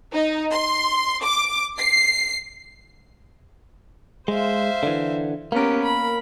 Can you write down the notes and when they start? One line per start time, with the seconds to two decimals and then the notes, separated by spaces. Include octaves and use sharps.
0.13 D#4
0.51 C6
1.23 D6
1.79 C7
4.28 G#3 C5 E5 F5
4.83 D3 E3
5.52 A#3 B3 C#4 G4 A#4
5.83 B5